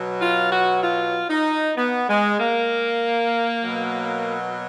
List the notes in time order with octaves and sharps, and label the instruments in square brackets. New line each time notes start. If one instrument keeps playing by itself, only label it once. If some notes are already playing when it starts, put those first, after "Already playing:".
Already playing: [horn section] B2 F#3
F4
F#4
F4
D#4
B3
G#3
A#3
B2 F#3